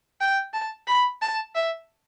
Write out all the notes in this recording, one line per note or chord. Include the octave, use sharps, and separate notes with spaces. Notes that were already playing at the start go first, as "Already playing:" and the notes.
G5
A5
B5
A5
E5